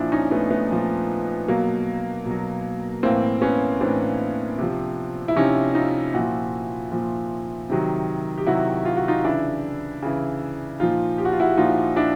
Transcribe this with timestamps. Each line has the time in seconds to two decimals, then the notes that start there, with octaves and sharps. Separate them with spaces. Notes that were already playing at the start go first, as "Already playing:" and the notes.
Already playing: A#2 F3 D4 E4
0.12 C#4 D#4
0.31 A3 B3
0.50 A3 B3
0.70 A#2 F3
1.48 B2 F#3 A#3
2.25 B2
2.31 F#3
3.03 A2 E3 A#3 C4
3.42 B3 C#4
3.81 A2 E3 C4 D4
4.58 C3 F3
5.28 E4
5.36 C3 F3 C#4 D#4
5.75 D#4 F4
6.14 A#2 F3 E4 F#4
6.91 A#2 F3
7.70 C3 D#3 F#3
8.38 G4
8.46 C3 D#3 F#3 E4 F#4
8.85 F4
8.97 F#4
9.08 D#4 F4
9.24 C#3 E3 D4 E4
10.03 C#3 E3
10.80 A#2 F3 D#4 F4
11.18 G4
11.25 F#4
11.32 F4
11.40 E4 F#4
11.57 A#2 F3 D#4 F4
11.96 D4 E4